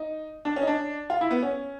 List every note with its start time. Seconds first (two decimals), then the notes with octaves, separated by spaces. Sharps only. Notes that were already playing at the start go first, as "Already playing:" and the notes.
Already playing: D#4
0.45 D4
0.56 C#4
0.62 D#4
0.67 D4
1.10 F4
1.21 E4
1.31 B3
1.43 C#4